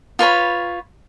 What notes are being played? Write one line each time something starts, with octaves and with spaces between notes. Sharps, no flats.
F4 B4 C#5 B5